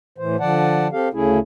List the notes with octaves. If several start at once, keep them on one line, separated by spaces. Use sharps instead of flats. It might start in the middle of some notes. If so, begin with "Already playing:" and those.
A2 E3 C5
D3 F3 D5 F#5 A5
C4 G4 A4 F5
D2 C#3 A3 C#4 E4 G#4